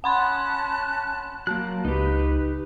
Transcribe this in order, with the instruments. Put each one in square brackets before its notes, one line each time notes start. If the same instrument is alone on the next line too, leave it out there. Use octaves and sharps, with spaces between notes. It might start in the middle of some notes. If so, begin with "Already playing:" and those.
[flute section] C#4 A5 F#6 [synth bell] F#5 B5 C6
[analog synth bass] F#3 [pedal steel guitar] A#3 A5 F#6
[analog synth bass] C#2 [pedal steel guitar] D#4 G4 [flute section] B4